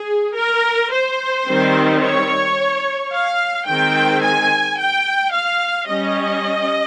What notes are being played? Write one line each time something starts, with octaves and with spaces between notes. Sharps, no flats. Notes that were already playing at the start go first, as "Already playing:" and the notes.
Already playing: G#4
A#4
C5
D#3 G3 C4
C#5
F5
D#3 G#3 C4 G5
G#5
G5
F5
G3 C#4 D#5